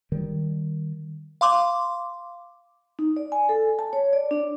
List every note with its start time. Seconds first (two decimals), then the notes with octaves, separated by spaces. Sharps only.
0.12 D#3 G3
1.41 F5 C6 D6
2.99 D#4
3.17 D5
3.32 G#5
3.49 A4
3.79 A5
3.93 C#5
4.13 D5
4.31 D4